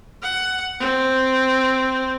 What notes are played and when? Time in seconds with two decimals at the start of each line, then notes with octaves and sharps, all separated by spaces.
0.22 F#5
0.80 C4